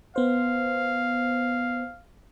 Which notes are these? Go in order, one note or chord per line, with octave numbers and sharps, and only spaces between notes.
B3 C5 F5